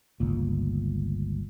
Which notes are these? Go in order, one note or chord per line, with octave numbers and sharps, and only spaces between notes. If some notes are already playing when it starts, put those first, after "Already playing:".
G1 C#2 A#2